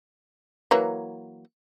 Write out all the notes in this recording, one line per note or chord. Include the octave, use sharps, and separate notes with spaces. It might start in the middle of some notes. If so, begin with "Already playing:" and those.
E3 F#3 A#3